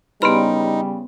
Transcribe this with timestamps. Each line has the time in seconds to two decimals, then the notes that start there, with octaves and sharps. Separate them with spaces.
0.22 C#3 G3 B3 D#4 E4 B4 B5 C6